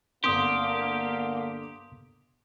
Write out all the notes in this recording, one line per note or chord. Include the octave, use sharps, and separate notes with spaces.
G1 D3 A#3 C4 G4 C6 D#6